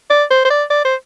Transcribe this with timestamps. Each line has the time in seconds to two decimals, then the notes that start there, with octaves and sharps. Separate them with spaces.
0.10 D5
0.30 C5
0.45 C5
0.50 D5
0.70 D5
0.85 C5